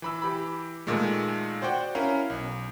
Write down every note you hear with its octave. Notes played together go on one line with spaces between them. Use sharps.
E3 B5 E6
E3 G4 B5
A#2 D#3 G#3 A3
F#4 C5 D5 F#5 G5
C#4 E4 A#4 F5
B1